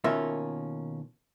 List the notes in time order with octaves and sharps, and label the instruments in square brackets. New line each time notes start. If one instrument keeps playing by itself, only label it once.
[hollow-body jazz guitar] B2 D#3 A#3 C#4 F4 E5